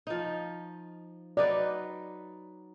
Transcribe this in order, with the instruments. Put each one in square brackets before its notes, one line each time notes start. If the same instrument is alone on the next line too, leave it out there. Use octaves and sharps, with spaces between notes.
[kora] F3 D#4
[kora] F#3 D#4 B4 [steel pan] D5